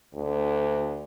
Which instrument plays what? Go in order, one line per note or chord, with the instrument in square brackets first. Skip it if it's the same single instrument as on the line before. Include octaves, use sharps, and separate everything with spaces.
[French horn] D2